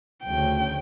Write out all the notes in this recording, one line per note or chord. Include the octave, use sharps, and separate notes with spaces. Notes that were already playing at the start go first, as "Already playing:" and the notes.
D2 C#3 G5